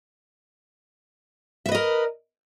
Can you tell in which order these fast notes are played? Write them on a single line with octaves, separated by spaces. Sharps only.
E5 B4 D#5 A#4